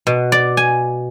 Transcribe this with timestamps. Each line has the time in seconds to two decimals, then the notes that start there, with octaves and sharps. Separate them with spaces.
0.07 B2
0.32 D5
0.57 G#5